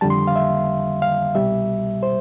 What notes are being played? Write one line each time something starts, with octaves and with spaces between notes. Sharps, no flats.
F2 D3 G3 A5
C6
F5
E5
F5
C2 B2 G3 E5
C5